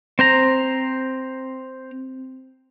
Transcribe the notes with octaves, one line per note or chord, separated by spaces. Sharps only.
C4 C5 A#5